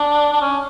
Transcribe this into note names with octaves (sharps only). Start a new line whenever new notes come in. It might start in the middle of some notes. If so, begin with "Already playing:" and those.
Already playing: D4
D4
C#4